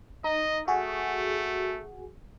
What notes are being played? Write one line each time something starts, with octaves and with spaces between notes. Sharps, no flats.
D#4 D#5
A3 F#4 G#4